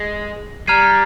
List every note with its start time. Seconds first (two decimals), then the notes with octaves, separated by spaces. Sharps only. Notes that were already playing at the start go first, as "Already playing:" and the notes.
Already playing: G#3
0.67 G3 A#5 F6 G#6 C7 D#7